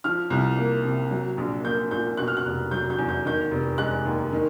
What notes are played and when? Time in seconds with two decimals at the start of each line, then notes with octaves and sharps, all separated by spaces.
0.04 F3 F6
0.30 C2
0.57 A#3
0.84 C3
1.11 F#3
1.38 A#1
1.64 A#3 G6
1.91 A#2 G6
2.17 B2 F#6
2.28 F6
2.37 F#6
2.45 F1
2.71 F#3 G6
2.90 G6
2.98 E2
3.09 G6
3.25 D#3 G6
3.51 F1
3.78 G#3 F#6
4.05 D#2
4.32 D#3